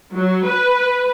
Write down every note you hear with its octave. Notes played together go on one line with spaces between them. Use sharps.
F#3
B4